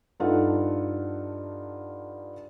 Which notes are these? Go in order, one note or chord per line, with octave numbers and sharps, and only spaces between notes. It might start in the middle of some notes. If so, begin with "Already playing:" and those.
G2 D#4 F4 A4 F#5